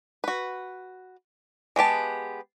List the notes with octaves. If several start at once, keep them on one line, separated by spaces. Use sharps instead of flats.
F#4 B4
G#3 B3 G4 A5